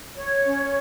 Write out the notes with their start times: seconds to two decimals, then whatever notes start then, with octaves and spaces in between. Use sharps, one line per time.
0.16 C#5
0.45 C#4